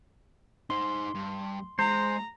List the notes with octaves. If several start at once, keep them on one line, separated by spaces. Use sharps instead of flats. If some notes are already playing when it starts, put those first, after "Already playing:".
D#4 C5 C6
G2
G#3 C5 A#5